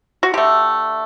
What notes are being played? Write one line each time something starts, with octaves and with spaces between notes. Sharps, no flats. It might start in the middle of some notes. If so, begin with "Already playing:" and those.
F#4
D3 A3 G4